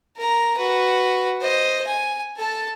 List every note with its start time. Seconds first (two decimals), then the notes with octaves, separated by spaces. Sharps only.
0.17 A#4 A#5
0.58 F#4 B4
1.41 C5 D#5
1.87 G#5
2.37 A4 A5